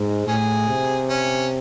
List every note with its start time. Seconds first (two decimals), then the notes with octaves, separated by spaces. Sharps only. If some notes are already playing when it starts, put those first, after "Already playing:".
Already playing: G#2
0.27 A2 C#4 G#4
0.68 C3
1.09 C#4